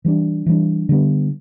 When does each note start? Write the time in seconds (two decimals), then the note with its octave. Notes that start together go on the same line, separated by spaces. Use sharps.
0.05 E3 G3 D4
0.46 E3 G3 D4
0.89 D3 G3 B3